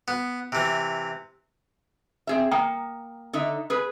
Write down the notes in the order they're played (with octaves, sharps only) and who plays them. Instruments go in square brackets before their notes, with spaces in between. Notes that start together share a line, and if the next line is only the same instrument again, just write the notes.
[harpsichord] B3
C3 E3
[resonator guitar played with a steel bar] C4 G#4 E5
[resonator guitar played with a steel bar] A#3 [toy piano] G5 A#5 D#6
[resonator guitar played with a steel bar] D3 D#4 E5
G#4 B4